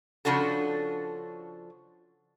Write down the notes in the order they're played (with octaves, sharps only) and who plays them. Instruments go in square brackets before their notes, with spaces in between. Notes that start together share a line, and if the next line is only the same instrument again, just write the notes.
[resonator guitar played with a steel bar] C#3 F3 D4 F#4 A4